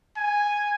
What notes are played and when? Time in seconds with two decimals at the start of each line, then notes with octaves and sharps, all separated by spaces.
0.17 G#5